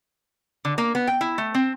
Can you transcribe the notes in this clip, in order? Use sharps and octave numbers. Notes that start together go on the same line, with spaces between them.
D3
A#3
B3
G5
E4
A3
C4